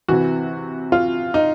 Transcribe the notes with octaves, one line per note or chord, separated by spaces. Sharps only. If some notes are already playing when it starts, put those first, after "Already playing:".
C3 E3 F#4
F4
D#4